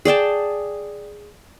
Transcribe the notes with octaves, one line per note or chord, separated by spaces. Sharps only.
G#4 D5 G5 A5